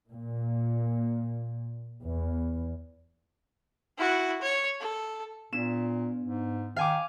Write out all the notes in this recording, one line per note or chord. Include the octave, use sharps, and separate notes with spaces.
A#2
E2
E4 F#4
C#5
A4
A#2 B3 D4 E7
G#2
D#3 F5 G#5 D6